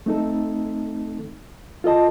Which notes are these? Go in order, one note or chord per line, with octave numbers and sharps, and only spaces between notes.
A3 C4 D#4 A4
F4 A4 D#5 A5